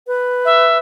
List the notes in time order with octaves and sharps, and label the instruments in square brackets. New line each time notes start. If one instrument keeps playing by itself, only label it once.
[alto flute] B4
[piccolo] E5